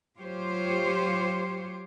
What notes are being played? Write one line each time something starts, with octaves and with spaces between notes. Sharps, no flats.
F#3 F4 G4 C5 C#5